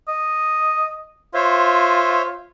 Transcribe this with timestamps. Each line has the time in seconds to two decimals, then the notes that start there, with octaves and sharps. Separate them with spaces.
0.08 D#5
1.34 F4 C5 C#5 E5